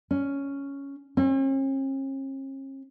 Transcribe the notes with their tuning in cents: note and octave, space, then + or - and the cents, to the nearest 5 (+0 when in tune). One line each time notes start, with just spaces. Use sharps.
C#4 +5
C#4 -45